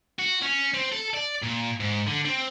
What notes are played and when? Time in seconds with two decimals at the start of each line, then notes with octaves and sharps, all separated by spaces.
0.19 F#4
0.43 C#4
0.74 C4
0.92 A4
1.14 D5
1.42 A#2
1.80 G#2
2.07 D3
2.25 C4